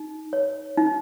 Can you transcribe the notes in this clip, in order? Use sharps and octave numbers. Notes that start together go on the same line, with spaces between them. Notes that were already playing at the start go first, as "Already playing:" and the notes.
Already playing: D#4
C#5
D#4